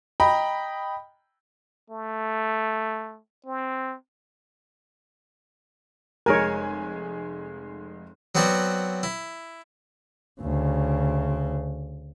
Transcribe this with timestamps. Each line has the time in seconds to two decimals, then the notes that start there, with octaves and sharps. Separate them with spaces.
0.20 D#5 G5 A#5 B5
1.90 A3
3.46 C4
6.26 F1 G#3 A#4 C#5 G#5
8.35 F#3 B3 C4 F#4 D5
9.03 E4
10.41 D2 C#3